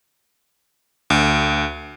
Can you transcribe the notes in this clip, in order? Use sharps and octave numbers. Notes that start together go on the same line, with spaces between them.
D2